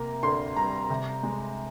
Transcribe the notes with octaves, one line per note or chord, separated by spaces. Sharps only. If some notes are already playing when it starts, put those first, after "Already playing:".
Already playing: C3 A#3 A#5
D2 C6
G3 A#5
C3
G#3